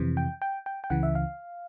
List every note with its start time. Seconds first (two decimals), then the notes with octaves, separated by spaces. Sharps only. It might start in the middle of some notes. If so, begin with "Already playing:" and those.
Already playing: F2 C3 E3
0.17 G5
0.42 G5
0.66 G5
0.84 G5
0.90 C#2 C#3 E3 F#5
1.03 E5
1.15 F5